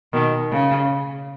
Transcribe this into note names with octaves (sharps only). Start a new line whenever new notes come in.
B2 D#3
C#3